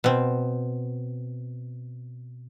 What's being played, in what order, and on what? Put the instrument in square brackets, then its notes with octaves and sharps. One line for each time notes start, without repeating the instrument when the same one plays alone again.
[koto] B2 C4